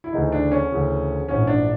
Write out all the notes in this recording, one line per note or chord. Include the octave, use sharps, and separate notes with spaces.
E4
D2 C#3 E3 D#4
D4
C#4
D2 C#3 E3
A#1 G#2 E3 C#4
D4